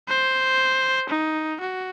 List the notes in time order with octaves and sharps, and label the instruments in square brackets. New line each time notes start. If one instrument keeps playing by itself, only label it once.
[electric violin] C5
D#4
F#4